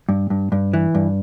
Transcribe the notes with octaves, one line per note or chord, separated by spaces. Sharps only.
G2
G2
G2
E3
G2